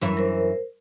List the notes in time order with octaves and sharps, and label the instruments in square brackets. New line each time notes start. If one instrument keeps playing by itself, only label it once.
[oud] F#2 E3 E5
[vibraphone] A#4 C5